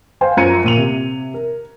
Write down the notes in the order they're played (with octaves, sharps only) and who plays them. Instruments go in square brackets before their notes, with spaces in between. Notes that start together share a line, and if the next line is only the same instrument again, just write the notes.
[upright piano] C5 F5 G#5 C6
F#2 F3 A#5 G#6 C#7 D#7
A#2 D#7 F7
C3
A#4